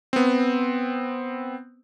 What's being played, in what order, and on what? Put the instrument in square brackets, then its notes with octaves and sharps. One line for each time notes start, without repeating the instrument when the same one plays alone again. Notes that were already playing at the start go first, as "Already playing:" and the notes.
[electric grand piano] B3 C4